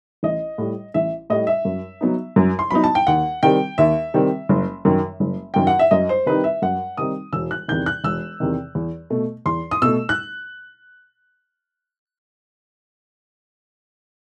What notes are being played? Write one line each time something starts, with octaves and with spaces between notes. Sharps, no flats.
A1 D#5
A2 G3
A1 E5
A2 G3 D#5
E5
F#2
F#3 B3 D#4
F#2
C6
F#3 B3 D#4 B5
A5
G5
D#2 F#5
D#3 G3 C4 G5
D#2 E5
D#3 G3 C4
F#1
F#2 D#3
F#1
F#2 D#3 G5
F#5
E5
F#2 D#5
C5
D#3 G3 C4 D#4 B4
E5
F#2 F#5
D#3 G3 C4 D#4 D#6
E1 E6
F#6
E2 C3 D#3 G6
F#6
E1 E6
E2 C3 D#3
E2
B2 A3
E2 C6
D#6
B2 A3 E6
F#6